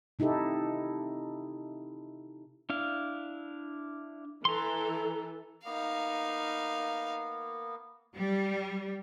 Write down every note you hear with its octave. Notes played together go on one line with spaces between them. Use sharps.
C3 D#4 E4 G4 A4
D4 E4 F5
E3 A4 A#5 C6
A#3 B3 D#4 F5
G3